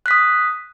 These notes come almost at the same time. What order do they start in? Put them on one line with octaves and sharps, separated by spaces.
F#6 B6 D#6